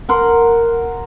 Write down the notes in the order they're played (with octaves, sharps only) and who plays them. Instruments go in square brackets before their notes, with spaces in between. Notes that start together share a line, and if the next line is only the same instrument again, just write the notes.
[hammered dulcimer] A#4 F#5 C6